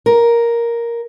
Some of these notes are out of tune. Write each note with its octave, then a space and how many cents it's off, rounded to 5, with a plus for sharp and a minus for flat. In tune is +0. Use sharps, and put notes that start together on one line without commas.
A#4 +5